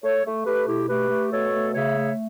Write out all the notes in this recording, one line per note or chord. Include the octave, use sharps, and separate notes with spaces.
A3 A4 C#5
A3
A3 G4 B4
B2 E4 G4
A3 G4 B4
A3
B2 A4 C#5
A3
C#3 C#5 E5
A3